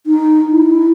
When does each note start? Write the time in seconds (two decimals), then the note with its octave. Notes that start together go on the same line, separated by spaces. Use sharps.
0.07 D#4
0.52 E4